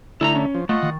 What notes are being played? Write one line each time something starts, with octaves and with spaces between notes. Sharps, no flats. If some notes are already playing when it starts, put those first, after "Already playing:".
D3 A3 E4 A5 A#5
C#4
F3
A3 F4 D#5 F#5
D#3